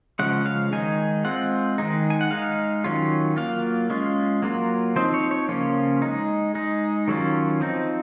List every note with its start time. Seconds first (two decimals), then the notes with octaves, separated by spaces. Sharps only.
0.19 C#3 F3 G#3 C#4 F#5
0.46 F5
0.72 D#3 G#3 D#4 G#5
1.25 G#3 C4 F4 F#5
1.78 D#3 G#3 D#4
2.10 G#5
2.21 F#5
2.31 G#3 D#4 F5
2.84 D#3 F#3 C#4 F4
3.37 F#3 A#3 F4 F5
3.90 G#3 C#4 F4
4.42 F#3 A#3 F4
4.96 F3 C4 D#4 C5
5.14 C#5
5.31 C#5
5.49 C#3 F3 A#3 C#4 F4
6.02 G#3 D#4
6.55 G#3 D#4
7.08 D#3 F#3 C#4 F4
7.61 F3 C4 D#4